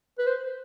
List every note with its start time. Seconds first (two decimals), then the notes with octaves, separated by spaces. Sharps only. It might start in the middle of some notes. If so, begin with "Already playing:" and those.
0.18 B4
0.27 C5